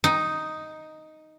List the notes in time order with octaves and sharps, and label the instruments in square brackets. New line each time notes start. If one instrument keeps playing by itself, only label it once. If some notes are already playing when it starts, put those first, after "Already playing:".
[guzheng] D#4